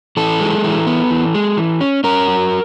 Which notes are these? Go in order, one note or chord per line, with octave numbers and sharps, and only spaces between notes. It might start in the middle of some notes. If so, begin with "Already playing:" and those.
E3 A4
G#3
E3
B3
E3
G#3
E3
C#4
C#4 A#4
F#3